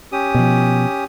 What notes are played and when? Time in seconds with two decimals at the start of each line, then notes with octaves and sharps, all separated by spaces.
0.12 C#4 G4 D#6
0.35 B2 F3